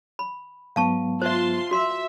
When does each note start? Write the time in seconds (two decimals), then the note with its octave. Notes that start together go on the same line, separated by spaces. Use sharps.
0.19 B5
0.76 G#2 F#3 B3 F5 A5 C#6
1.22 F4 C5 E5 A5 C6
1.71 F#4 E5 C6